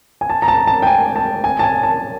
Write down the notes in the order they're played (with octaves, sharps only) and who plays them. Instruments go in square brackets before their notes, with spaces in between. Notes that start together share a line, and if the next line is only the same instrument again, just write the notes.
[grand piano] G#5
A5
A#5
A5
A5
G5
G#5
A5
G#5
A5
G#5
A5